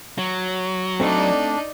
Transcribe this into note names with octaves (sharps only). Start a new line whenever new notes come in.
F#3
A3 C4 D4 D#4 D5